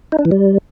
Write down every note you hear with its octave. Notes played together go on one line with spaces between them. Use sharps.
D#4
D4
E3
G3